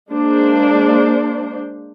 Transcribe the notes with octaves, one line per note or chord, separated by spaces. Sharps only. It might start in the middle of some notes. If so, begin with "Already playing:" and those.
G#3 A#3 D4 C5